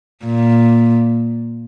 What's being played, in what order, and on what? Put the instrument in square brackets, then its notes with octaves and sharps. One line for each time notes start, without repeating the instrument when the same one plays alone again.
[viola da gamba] A#2